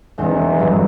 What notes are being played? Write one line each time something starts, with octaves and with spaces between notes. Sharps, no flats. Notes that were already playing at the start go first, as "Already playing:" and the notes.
E1 E2 C3 G6
G1 G2 F#3